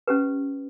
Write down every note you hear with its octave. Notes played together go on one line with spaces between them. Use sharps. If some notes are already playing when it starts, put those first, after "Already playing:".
C#4 G4 B4